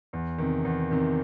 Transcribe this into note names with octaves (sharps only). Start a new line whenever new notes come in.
E2
C3 D#3
E2
C3 D#3